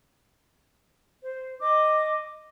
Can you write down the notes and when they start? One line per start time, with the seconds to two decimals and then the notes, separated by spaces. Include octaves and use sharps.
1.23 C5
1.60 D#5 D6